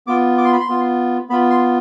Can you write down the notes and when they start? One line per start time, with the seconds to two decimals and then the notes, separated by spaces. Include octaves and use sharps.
0.07 B3 F4 D6
0.38 D6
0.45 C6
0.53 B5
0.60 C6
0.69 B3 F4
1.29 B3 F4 B5
1.50 C6